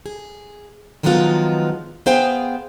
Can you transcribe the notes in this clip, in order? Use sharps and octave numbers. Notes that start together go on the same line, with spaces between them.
G#4
D#3 F3 F#3 G#3 B3 F4
B3 G#4 C5 F5 G5 G#5